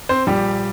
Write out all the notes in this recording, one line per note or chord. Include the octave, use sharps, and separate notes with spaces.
C4 C5
A#1 A#2 G3 G4